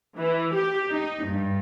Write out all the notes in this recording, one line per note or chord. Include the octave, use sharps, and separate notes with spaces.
E3
G4
D#4
G2